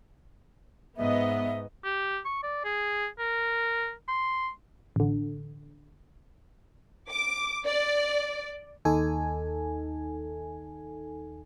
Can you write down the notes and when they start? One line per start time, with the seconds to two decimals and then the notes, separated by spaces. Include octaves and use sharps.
0.97 G#2 B3 D#5 E5
1.84 G4
2.25 C#6
2.43 D5
2.64 G#4
3.19 A#4
4.08 C6
4.96 A1 D3
7.10 D6
7.65 D5
8.85 D#2 D#4 A4 G#5